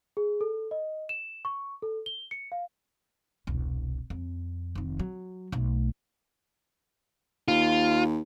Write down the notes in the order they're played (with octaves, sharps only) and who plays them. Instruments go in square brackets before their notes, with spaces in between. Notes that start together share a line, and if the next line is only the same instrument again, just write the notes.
[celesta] G#4
A4
D#5
E7
C#6
A4
G7
C#7
F5
[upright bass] E1 C2
F2
F1 D#3
F#3
B1 A3
[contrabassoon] D#2 [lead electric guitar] F4